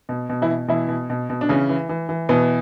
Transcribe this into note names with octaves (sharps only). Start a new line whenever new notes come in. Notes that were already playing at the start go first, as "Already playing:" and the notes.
B2
B2
E3 E4
B2
B2 E3 E4
B2
B2
B2
D4
C#3 E3 C#4
E3
E3
E3
B2 E3 B3